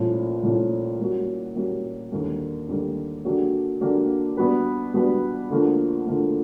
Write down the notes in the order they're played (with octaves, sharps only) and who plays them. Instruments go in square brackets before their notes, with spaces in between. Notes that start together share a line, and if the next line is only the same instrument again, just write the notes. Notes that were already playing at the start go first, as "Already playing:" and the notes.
Already playing: [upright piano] C2 A#2 F3 A3 C#4
C2 A#2 F3 A3 C#4
G3 A#3 C#4 F#4
G3 A#3 C#4 F#4
D#2 D3 G3 A#3
D#2 D3 G3 A#3
D3 F#3 A#3 D4 G4
D3 F#3 A#3 D4 G4
G3 B3 D4 F#4 B4
G3 B3 D4 F#4 B4
D2 D3 F3 A#3
D2 D3 F3 A#3